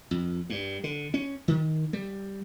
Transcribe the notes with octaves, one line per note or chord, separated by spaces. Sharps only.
F2
G2
D3
C#4
D#3
G3